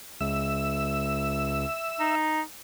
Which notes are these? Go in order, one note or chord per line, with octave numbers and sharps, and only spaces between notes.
C#2 E5 E6
D#4